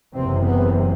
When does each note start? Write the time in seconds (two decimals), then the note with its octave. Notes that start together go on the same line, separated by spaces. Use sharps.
0.15 F#1 E2 C3 C4
0.44 B3